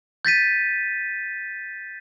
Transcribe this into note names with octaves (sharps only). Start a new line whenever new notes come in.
G6 A6 B6 D#7